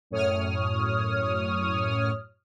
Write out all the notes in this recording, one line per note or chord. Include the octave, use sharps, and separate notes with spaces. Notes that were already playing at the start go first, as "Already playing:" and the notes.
F#2 A2 C#5 D#6 F6